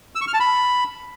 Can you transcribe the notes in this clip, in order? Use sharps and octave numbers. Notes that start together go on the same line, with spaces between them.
E6
C#6
F6
A5
B5